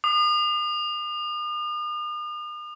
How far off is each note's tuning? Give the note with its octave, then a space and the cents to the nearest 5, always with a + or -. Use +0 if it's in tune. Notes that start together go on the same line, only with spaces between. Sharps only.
D#6 -45